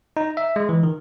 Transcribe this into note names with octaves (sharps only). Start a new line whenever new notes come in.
D#4
E5
G#3
E3
D#3